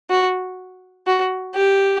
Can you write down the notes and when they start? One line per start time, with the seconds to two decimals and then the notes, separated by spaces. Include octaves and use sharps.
0.10 F#4
1.07 F#4
1.55 G4